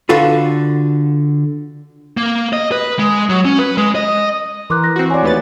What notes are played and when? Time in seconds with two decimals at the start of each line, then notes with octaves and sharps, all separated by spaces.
0.09 D3 F4 F#4 A4 B4
2.17 A#3
2.53 D#5
2.72 B4
2.99 G#3
3.30 F#3
3.45 C#4
3.59 B4
3.77 G#3
3.95 D#5
4.70 E3 A#4 C6 D6 F#6
4.84 F#6 A#6
4.96 C4 F#4
5.10 C#5 D5 G#5
5.23 D#2 A3 B3 A6